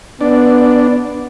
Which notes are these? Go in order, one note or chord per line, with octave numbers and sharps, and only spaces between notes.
B3 D4